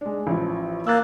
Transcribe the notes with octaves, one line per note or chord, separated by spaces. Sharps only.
G#3 D4
A1 F3 E4
A#3 E6 F#6 A6